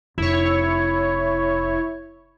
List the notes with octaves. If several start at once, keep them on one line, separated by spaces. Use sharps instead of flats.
F1 E4 C#5